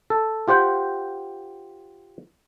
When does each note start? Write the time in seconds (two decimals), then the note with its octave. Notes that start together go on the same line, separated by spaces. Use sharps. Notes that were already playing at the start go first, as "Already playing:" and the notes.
0.10 A4
0.48 F4 G4 C5 F#5 G5